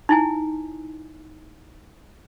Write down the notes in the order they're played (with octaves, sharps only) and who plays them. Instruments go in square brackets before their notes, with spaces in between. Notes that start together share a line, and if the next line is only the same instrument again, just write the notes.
[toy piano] D#4 E4 G#5